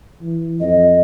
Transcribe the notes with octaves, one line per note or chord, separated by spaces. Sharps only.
E3
F2 D#5